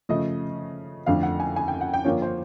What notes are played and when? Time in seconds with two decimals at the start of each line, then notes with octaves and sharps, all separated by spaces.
0.09 C#3 F3 A3 D#5
1.06 F2 D3 F3 A3 D4 F5
1.23 F#5
1.40 G#5
1.56 G#5
1.68 G5
1.81 F#5
1.94 G5
2.05 D3 F3 A#3 D4 F4 C#5
2.22 C5